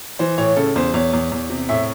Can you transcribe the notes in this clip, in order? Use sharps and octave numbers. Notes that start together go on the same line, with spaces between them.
E3 C5
A2 C#5
C#3 A4
E2 C5
E2 C#5
E2
E2
C3
A2 E5